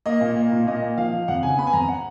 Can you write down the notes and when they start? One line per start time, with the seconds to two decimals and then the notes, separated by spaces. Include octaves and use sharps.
0.06 A#3 D#5
0.21 A#2
0.36 A#3
0.52 A#2
0.67 A#2 D#5
0.83 A#3
0.98 F3 F5
1.13 F3
1.28 F2 F#5
1.43 C#3 G#5
1.58 B3 B5
1.67 G#5
1.73 F2 A#5
1.88 F#5